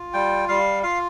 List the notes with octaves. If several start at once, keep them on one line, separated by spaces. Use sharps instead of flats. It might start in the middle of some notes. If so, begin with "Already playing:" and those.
Already playing: F4
G3 G5
G3 F5
F4 F5